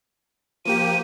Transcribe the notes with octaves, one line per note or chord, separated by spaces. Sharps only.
F3 A#3 G4 D#7